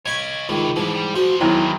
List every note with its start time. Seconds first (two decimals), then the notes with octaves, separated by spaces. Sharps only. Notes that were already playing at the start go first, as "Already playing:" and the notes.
0.05 C#5 D#5 G#5 B5 C#6
0.49 C#2 C3 D#3 E3
0.76 G#2 B2 E3 G3
0.95 G3
1.15 A#2 F3 F#4 C5
1.40 E2 D#3 E3 F#3 G#3 E4